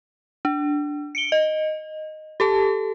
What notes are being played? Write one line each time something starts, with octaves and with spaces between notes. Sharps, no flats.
D4
C#7 D7 G7
D#5
G4 A4 A5